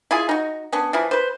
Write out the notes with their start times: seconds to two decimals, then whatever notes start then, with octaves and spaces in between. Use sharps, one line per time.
0.11 E4 F4 G#4
0.29 D#4 F#4
0.72 B3 C#4 D4
0.93 E3 F3 E4
1.11 B4 C5